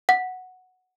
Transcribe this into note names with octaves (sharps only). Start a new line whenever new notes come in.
F#5